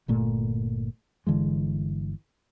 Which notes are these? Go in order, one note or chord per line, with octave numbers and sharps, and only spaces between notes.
G1 A#2 A3
G1 D3 E3 G#3